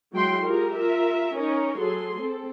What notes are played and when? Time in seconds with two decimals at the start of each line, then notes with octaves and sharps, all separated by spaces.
0.13 F#3 G#3 E4 F#4 G5 C6
0.46 F4 G4 G#4 A#4
0.77 F4 A#4 E5
1.35 C#4 D#4 A#4 C#5
1.80 F#3 G#4 A4 C6
2.19 C4 A4